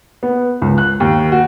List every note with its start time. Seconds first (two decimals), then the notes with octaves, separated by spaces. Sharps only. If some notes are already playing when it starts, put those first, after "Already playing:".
0.23 B3
0.62 C#2
0.78 F#6
1.00 D#2
1.32 F#4